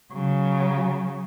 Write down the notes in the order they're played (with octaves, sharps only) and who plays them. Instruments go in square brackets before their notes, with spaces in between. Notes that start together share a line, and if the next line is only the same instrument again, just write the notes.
[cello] C#3 F#3